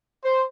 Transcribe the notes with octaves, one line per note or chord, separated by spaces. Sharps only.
C5